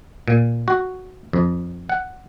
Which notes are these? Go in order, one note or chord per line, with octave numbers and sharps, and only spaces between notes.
A#2
F#4
F2
F#5